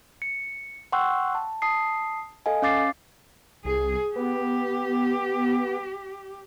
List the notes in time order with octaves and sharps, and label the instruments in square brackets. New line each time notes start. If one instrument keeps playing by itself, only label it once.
[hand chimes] C#7
F#5 G5 C6 C#6 E6 F#6
A5
A5 D#6 C7
A4 D#5 F5 G#5
C#4 F5 D6 A6 C7
[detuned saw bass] C2 [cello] G#4
[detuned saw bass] B3 [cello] G4